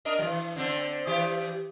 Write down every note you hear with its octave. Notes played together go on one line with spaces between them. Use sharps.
D4 A#4 D#5
E3 F#3
D3 C4 D4
E3 G4